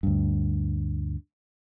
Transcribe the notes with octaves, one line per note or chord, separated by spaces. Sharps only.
D2 G2